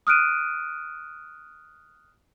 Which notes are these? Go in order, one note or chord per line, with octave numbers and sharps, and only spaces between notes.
D#6 F6 F#6 D7 D#7